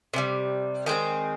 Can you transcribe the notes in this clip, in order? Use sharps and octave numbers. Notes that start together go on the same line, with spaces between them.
C3 D#3 G3
D#3 G#3 C4 G5